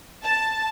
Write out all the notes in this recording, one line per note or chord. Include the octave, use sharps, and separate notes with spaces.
A5